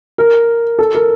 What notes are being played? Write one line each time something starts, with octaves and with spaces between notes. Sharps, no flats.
A#4
A4
A#4